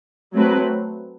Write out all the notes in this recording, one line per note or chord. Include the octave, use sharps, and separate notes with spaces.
F#3 A3 C4 F#4 B4